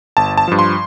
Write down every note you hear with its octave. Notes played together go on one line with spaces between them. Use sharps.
G1 A5
A5
G2 F3
C6